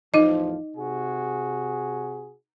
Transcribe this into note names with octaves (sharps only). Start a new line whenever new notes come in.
E2 A2 F3 D#4 D#5
C3 F#4 G#4